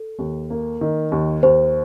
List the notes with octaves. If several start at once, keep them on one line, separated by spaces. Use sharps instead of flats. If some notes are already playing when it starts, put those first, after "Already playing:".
Already playing: A4
D#2
A#3
D#3
D#2
D#2 C5